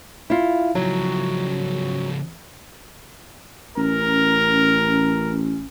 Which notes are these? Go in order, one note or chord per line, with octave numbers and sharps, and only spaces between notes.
E4 F4
C#2 F3 F#3
A1 C#4 A#4